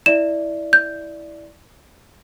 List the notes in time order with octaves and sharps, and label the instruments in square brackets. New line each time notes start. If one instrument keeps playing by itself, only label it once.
[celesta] E4 D5 E5 [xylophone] E7
[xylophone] G6